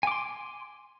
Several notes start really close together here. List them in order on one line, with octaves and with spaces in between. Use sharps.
G#5 D6 C6